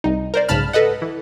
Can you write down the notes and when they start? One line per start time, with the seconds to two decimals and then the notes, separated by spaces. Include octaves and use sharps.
0.04 C2 D#4
0.34 A#4 C5 D5
0.49 B1 G#2 C#3 A5 B5 F6
0.73 A4 B4 D#5 F#5
1.02 E3